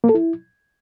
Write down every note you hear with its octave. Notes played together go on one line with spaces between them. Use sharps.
A#3
A4
E4